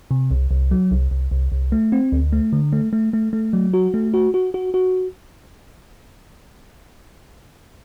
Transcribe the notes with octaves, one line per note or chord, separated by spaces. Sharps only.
C3
C2
C2
F#3
C2
C2
C2
C2
A3
C4
D2
A3
D3
A3
A3
A3
A3
F#3
F#4
A3
F#4
F#4
F#4
F#4